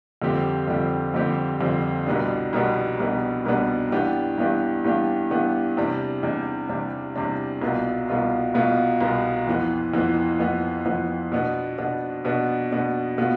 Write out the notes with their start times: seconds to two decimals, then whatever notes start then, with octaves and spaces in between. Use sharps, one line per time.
0.22 F2 D3 G3 C4 G4
0.68 F2 D3 G3 C4 G4
1.14 F2 D3 G3 C4 G4
1.60 F2 D3 G3 C4 G4
2.06 C2 B2 G3 B3 D4
2.53 C2 B2 G3 B3 D4
2.99 C2 B2 G3 B3 D4
3.45 C2 B2 G3 B3 D4
3.91 G2 E3 B3 D4 G4
4.38 G2 E3 B3 D4 G4
4.84 G2 E3 B3 D4 G4
5.31 G2 E3 B3 D4 G4
5.77 E2 C3 G3 D4
6.23 E2 C3 G3 D4
6.69 E2 C3 G3 D4
7.16 E2 C3 G3 D4
7.61 C2 B2 B3 F4
8.08 C2 B2 B3 F4
8.54 C2 B2 B3 F4
9.00 C2 B2 B3 F4
9.47 F2 E3 B3
9.94 F2 E3 B3
10.40 F2 E3 B3
10.86 F2 E3 B3
11.32 B2 B3 D4
11.78 B2 B3 D4
12.25 B2 B3 D4
12.71 B2 B3 D4
13.18 B2 B3 F4